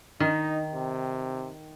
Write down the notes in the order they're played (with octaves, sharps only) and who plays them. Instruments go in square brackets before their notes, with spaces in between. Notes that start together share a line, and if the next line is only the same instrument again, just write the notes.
[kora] D#3 [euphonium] D#4
[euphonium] C3